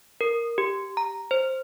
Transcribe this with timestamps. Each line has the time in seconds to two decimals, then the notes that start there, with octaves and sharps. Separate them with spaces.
0.21 A#4
0.58 G4
0.97 A#5
1.31 C5